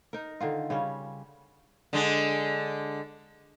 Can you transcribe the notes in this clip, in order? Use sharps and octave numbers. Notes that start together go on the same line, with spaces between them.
D#4 A#4
D3 D#3 F4
C#3 G3 C#4
D3 G#3